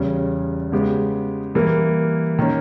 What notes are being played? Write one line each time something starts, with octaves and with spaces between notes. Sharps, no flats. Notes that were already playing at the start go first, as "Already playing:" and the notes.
Already playing: E2 C#3 G3 C#4
C#3 G#3 B3 G4
E3 G3 A#3 E4 A#4
D#3 A#3 C#4